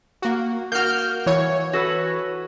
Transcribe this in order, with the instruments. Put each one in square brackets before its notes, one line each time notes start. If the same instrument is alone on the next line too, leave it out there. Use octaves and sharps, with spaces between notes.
[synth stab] A#3 F#4
[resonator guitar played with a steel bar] A#3 F#4 [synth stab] F6 G6
[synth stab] E3 C#5
[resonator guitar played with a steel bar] F#4 A4 B4